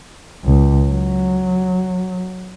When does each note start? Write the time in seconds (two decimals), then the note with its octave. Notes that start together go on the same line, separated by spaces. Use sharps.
0.45 C#2
0.90 F#3